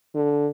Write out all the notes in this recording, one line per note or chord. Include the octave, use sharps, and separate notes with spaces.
D3